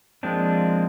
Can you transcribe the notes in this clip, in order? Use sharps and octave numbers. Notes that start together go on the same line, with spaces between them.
F3 G#3 A#3 C4 D4